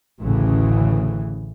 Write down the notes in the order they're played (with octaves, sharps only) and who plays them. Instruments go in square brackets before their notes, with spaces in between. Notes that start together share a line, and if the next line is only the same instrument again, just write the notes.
[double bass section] A1 D2 A2 C#3 E3